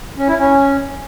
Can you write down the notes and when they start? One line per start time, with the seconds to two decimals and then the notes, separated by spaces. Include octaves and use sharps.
0.18 C#4
0.28 E4
0.39 C#4